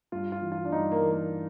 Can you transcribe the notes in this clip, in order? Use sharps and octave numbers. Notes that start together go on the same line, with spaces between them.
G2 F4
F4
E3
F4
D4
G2 D#4
A#3
E3
A#3